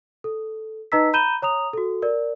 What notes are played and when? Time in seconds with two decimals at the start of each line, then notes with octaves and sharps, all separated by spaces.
0.24 A4
0.92 D#4 B4 D#5 A#5 E6 B6
1.13 A#5 B5 G6 D#7 E7 G7
1.42 C#5 A#5 D#6 F7
1.73 F#4 A4
2.02 A#4 D5